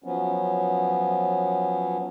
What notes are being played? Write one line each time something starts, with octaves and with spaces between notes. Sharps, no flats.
F3 F#3 B3 C#4